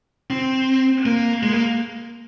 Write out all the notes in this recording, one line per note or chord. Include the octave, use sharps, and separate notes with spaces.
C4
A#3
G#3
A#3